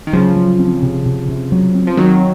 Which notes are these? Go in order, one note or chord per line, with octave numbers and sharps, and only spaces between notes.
D#3
C#3 F3 F#3
F#3
C4
C3
C3
C3
F#3
C4
F3
D#3 F#3 C4